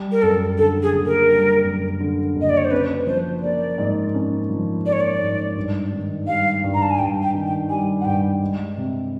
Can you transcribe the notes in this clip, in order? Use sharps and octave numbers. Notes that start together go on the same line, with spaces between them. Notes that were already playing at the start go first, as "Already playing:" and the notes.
Already playing: G3
A#4
F#2 A4
D3 A4
G#4
F#1
A#4
G3
F#2
D3
F#1
D#5
D5
C#5
C5
C#4 B4
F3 C5
A#3 D5
G#2
C#4
F3
A#3 D5
C#5
D5
G#2
G2
D#3
G3 F5
G2
A#5
A5
G#5
G2 G5
G5
D#3
G5
G3 G#5
F#5
G2 G5
G#3
C3